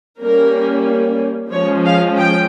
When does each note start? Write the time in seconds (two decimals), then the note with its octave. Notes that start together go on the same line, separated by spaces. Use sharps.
0.22 G3 A#3 C#4 A#4
1.52 F3 G#3 C#4 C#5
1.85 F5
2.18 G5